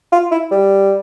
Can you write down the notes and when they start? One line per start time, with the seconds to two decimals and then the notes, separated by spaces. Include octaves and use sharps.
0.12 F4
0.31 E4
0.51 G3